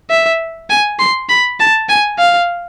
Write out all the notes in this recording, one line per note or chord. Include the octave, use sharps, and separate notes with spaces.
E5
G#5
C6
B5
A5
G#5
F5